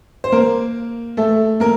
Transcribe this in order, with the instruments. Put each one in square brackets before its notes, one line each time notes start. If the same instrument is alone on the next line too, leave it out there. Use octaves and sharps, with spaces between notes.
[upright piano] C5
A#3 A#4
A3 A4
A#3 A#4